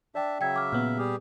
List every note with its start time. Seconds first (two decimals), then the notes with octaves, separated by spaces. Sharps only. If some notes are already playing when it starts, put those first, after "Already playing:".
0.15 D4 D5 E5 G5 A5
0.41 C#3 F#3 E5 G5 G#6
0.56 D6 F6
0.72 A#2 B3 F6
0.98 G3 G4 G#4